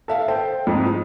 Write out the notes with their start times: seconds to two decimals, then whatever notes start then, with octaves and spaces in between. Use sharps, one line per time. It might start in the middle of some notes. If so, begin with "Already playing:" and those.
0.08 A4 E5 F5
0.28 A4 C5 G5
0.67 F2 G#2
0.85 F3